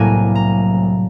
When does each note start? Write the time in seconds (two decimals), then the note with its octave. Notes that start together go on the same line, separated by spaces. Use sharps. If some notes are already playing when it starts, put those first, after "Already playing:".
Already playing: C2 A2 F#3 A#3 D5 G#5
0.35 A#5